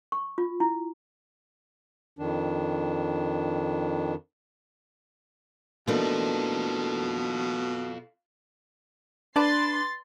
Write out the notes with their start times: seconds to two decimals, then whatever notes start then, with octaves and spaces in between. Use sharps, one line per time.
0.12 C#6
0.38 F4
0.60 E4
2.19 F2 D#3 D4
5.87 B2 E3 A3 A#3 D4 D#4 F4 A4
9.36 D4 B4 D5 A5 C6 A6